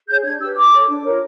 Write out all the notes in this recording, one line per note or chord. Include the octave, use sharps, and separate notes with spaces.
G#4 C#5 G6
D4 G#6
G4 B4 E6
F4 D6
A4 C#5
D4
F4 A#4 C#5